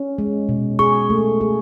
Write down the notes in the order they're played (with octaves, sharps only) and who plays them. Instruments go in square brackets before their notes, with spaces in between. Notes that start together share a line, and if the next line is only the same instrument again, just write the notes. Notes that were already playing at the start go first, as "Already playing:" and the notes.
Already playing: [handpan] C#4
G#3
B2
[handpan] G#4 [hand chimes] C#6
[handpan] A3
G#4